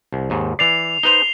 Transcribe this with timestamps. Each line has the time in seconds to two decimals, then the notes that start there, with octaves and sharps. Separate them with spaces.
0.13 C2
0.30 D#2 G#2
0.59 E3 D5 C7 F7
1.03 D#4 B4 C5 F7 G7